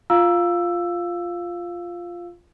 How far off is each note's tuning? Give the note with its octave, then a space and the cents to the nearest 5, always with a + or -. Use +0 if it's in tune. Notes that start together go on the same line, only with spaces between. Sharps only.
F4 +0 F5 +0 E6 +10